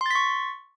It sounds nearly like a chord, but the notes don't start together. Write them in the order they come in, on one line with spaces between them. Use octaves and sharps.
C6 A6 B6 C#6